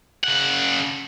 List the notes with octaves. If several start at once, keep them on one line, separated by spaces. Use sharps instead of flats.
C#3 F#5